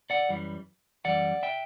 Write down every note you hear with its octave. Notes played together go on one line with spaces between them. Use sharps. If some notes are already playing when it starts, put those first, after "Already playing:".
D5 F#5
F#2 E3 G3
F#2 E3 G3 D5 F#5
E5 G5